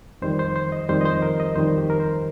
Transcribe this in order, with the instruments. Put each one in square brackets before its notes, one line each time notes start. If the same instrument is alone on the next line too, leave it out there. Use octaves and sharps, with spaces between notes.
[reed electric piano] F2 D#3 G3 C5
C5
C5
D#5
F2 D#3 G3 C5
D#5
C5
A#4
D#5
F2 D#3 G3 C5
G4
A#4
C5